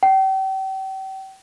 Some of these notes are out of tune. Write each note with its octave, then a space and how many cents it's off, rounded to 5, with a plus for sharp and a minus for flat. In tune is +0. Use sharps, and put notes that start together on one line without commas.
G5 -35